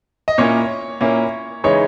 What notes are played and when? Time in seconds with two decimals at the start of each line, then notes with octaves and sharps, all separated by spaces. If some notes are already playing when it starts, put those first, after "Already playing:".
0.28 D#5
0.38 A#2 A#3 C#4 E4 C#5
1.01 A#2 A#3 C#4 E4
1.64 C#3 E3 G#3 D#4 C#5